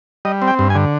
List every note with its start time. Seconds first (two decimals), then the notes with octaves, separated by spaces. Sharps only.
0.25 G3 D#5
0.42 C4
0.48 G5
0.59 G2
0.70 G#5
0.75 D3